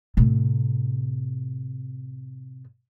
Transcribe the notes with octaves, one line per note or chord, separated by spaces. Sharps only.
A2 C3